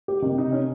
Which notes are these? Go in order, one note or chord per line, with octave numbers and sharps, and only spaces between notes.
G4
C3 D#3
D#4
C#4